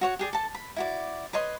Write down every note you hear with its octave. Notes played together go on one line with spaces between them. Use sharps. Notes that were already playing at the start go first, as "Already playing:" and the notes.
F#4 C#5 F#5
G4 G#4 D5
A4 A5
B5
E4 F#4 D5
B4 C#5 D#5 C6